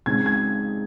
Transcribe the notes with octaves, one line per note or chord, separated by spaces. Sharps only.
C#3 G#3 C4 D#4 G#6
G#6